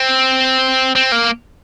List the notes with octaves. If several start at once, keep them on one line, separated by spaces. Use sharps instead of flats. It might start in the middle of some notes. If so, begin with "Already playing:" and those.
Already playing: C4
C4
A#3